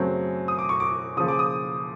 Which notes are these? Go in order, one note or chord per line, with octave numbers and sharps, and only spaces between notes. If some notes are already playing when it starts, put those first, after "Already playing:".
Already playing: F#2 C#3 F#3 A3 C4
D#6
D6
C#6
D6
C#3 F3 A#3 D#6
D6
D#6